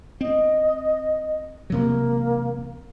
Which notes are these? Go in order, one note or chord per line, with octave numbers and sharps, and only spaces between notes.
C4 D#5
E1 C3 F#3 A#3